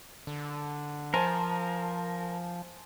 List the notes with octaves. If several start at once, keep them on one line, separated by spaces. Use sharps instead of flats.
D3
F3 A#4 C5 G#5 A5